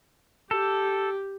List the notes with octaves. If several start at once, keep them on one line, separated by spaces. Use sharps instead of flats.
G4 A4